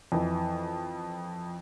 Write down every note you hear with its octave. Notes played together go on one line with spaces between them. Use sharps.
F2 E3